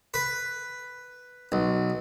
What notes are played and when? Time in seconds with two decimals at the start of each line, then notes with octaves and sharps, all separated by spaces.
0.14 B4
1.52 B1